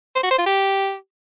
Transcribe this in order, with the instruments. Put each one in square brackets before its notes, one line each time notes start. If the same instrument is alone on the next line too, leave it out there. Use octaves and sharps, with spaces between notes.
[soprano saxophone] C5
F#4
C5
F4
G4